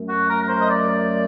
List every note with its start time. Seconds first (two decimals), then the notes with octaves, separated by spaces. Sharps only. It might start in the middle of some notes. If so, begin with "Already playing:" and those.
Already playing: F#2 F#3 A3
0.09 F#4
0.28 A#4
0.40 A#4
0.49 C5
0.60 D#5
0.69 D5